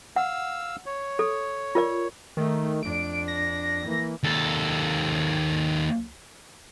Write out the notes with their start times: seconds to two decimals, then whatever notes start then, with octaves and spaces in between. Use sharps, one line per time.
0.16 F5 F#5 E6
0.86 C#5
1.19 A4
1.75 F4 A#4 D5
2.37 D#3 A3
2.83 F2 D4 D7
3.28 A#6
3.86 E3 A#3
4.24 D#2 A4